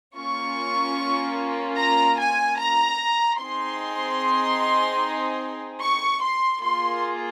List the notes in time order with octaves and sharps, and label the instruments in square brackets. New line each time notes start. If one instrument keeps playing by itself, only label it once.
[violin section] A#3 C#4 F4 C#6
A#5
G#5
A#5
C4 D#4 G#4 C6
C#6
C6
A#3 F4 G#4 C6